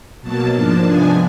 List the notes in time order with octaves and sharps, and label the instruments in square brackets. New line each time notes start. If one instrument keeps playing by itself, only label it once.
[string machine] B2 F#3 A#3 A5
G#2 F3 A#3 D4 A5
C3 F3 G#3 B3 D4 G#5